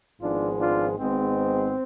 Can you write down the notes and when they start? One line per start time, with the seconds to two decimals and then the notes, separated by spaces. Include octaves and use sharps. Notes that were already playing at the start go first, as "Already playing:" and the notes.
0.20 G#1 G#2 F3 G#3 B3 D4 F4
0.59 D4 F4
0.97 G#1 G#2 G#3 B3 C4